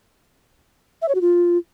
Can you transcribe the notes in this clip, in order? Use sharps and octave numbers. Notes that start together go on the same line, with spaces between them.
E5
C#5
F#4
F4